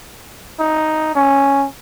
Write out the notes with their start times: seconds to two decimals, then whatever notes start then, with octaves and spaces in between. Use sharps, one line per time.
0.59 D#4
1.15 C#4